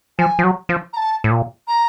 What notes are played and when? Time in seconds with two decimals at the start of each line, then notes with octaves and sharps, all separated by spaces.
0.19 F3 G#5
0.39 F3
0.44 F#3
0.69 F3
0.93 A#5
0.97 A5
1.24 A2
1.31 A#2
1.68 A#5